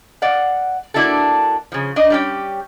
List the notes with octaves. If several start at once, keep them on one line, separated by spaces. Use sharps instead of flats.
D5 F5 F#5
A#3 D4 E4 F#4 A4
C#3 F3
D4 D#5
G3 C#4 G4